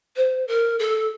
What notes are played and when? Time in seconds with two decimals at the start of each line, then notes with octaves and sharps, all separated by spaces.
0.16 C5
0.48 A#4
0.79 A4